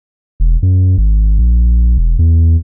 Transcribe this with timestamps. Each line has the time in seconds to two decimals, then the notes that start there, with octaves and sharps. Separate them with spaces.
0.40 E1
0.63 F#2
0.98 G#1
1.38 A#1
1.98 E1
2.19 E2